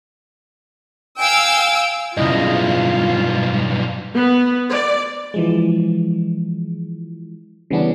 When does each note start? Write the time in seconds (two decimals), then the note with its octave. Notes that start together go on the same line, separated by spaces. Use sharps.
1.19 F5 G5 G#5 E6 D7
2.17 B1 G2 C#3 E4 F4 D#5
4.16 B3
4.70 D5
5.34 E3 F3 G#3
7.70 C#3 E3 G3 B3 C#4 D4